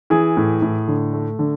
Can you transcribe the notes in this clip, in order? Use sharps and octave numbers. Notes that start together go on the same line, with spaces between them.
E3 G#4
A2
A2
D3
A3
D3